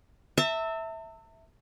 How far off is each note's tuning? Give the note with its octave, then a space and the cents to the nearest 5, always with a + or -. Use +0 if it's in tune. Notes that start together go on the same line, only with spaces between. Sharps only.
E5 -10 A5 +45